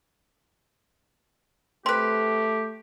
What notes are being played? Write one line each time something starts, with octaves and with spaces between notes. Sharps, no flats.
A3 C4 G4 B4 C6